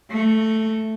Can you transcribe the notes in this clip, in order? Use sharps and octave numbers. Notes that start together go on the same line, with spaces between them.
A3